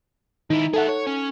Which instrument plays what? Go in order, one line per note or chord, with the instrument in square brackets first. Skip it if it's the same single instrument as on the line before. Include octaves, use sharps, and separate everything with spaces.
[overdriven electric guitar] D#3 E4 [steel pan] D#4
[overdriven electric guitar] G#4 E5 [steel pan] A4 F#5
[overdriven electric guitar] C#5
C#4